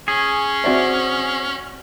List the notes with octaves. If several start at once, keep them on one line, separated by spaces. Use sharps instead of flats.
C#4 G#4
C4 F#4 C5 D5 E5